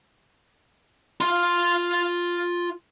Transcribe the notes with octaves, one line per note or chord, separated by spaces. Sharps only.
F4 C6